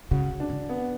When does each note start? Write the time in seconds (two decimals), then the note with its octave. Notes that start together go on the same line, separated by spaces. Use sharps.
0.11 C#3 F#4
0.40 D4
0.50 C#3
0.69 B3